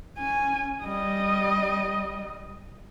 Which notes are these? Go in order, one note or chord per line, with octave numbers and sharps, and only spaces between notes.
C#4 G#5
G3 D#5